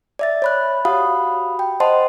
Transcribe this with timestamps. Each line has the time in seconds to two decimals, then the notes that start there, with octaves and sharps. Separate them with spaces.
0.19 D5 E5 A6
0.42 C#5 B5 F#6
0.85 F#4 G4 F5 F#5 B5 D#6
1.59 G5
1.80 C5 D#5 F#5 A5 C6